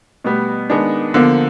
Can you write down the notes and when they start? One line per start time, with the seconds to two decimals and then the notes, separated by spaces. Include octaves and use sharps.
0.24 B2 G3 A3 B3
0.70 D#3 G#3 B3 D4
1.14 D3 F3 A#3 B3